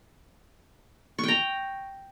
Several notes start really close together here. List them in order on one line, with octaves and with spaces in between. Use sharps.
C#6 G5 A#5